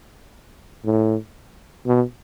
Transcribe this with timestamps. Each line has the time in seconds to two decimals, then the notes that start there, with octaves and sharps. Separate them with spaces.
0.85 A2
1.86 B2